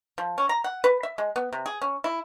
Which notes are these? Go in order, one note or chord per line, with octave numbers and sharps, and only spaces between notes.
F3
C#4
A#5
F#5
B4
E5
G#3
B3
C3
G#4
C#4
E4